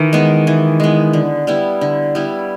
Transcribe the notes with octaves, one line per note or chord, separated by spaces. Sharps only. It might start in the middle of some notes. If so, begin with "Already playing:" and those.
Already playing: D#3 E3
G#3 B3
E3
G#3 B3
D3
G3 B3 E4
D3
G3 B3 E4